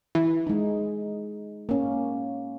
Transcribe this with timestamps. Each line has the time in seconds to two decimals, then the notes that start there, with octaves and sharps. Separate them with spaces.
0.15 E3
0.47 G#3 D#4
1.69 A#3 C#4